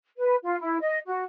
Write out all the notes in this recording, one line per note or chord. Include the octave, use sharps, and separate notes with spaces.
B4
F4
E4
D#5
F#4